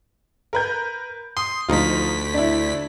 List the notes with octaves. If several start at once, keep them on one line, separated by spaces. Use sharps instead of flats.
A#4 B4 G6
C6 D#6
D2 F3 D#4 F4 B6
D4 E4